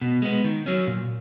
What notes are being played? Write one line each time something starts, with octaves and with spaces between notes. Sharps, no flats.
B2
G#3 B3
D#3
F#3 C#4
A#2